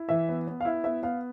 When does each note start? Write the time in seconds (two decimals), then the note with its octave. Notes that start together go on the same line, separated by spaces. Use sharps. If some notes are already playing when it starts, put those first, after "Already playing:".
Already playing: E4
0.09 E3 E5
0.29 B3
0.47 B3
0.60 F5
0.65 E4 E5
0.84 B3 E5
1.03 B3 F5